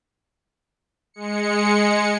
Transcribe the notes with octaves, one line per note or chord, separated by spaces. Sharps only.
G#3 C#7